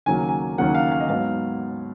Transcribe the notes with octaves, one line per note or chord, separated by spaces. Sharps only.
D#2 C#3 F#3 A#3 G#5
G#5
D#2 C#3 F#3 A#3 F#5
F5
F5
D#5
G#2 F#3 B3 F5